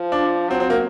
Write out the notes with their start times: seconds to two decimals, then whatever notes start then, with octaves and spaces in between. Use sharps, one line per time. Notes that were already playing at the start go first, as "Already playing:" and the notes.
Already playing: F3
0.12 D4
0.50 F#3 C4
0.60 C4
0.70 A#3